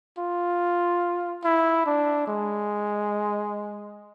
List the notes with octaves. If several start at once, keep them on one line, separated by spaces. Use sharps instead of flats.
F4
E4
D4
G#3